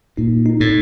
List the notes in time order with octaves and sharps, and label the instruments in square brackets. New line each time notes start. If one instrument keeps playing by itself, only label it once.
[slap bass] A#2 [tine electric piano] D#4
[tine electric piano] D#4
[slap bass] A2